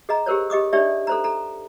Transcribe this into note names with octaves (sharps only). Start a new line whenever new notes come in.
G#4 D#5 A#5
G4 G#4 A#4 C5 C#5
G4 D#5 D6 D#6
D4 D#4 G4 C#5 D5 E5
A4 C5 A#5
A4 A#5